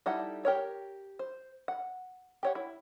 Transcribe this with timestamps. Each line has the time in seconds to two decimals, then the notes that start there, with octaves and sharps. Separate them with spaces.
0.06 G3 D#4 E4 A4 F#5
0.45 G4 A#4 C#5
1.19 C5
1.68 F#5
2.43 G4 C#5 F#5
2.55 E4